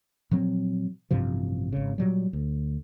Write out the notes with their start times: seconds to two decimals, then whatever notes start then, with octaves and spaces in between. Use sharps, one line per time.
0.31 A#2 F3 F#3 C4
1.11 A1 G2 C3 F3
1.73 G#1 C#3
1.98 A#2 F#3 G3
2.33 D2